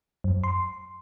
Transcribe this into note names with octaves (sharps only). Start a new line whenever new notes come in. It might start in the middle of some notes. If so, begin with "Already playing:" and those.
F#2
C6